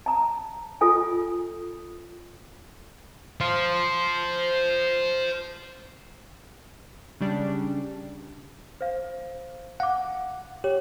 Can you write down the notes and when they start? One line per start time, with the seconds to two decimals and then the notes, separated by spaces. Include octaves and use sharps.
0.06 A5 A#5
0.81 F4 A4 G#5
3.41 C5 F5
7.20 C#3 G3 D4
8.81 C5 F5
9.80 F5 F#5 D6
10.64 G4 C#5